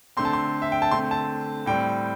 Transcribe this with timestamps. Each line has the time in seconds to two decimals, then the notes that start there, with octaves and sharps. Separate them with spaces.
0.17 D3 A3 C4 C6
0.25 A5
0.33 C6
0.62 E5
0.72 G5
0.82 A5
0.91 D3 A3 C4 C6
1.11 A5
1.66 A2 G3 C4 G5